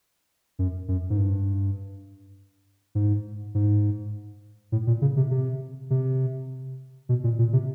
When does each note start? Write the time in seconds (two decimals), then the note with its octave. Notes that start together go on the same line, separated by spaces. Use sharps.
0.59 F#2
0.88 F#2
1.10 G#2
1.17 G2
2.95 G#2
3.55 G#2
4.72 A2
4.87 A#2
5.02 C#3
5.17 C3
5.31 C3
5.90 C3
7.09 B2
7.24 A#2
7.39 A#2
7.53 C3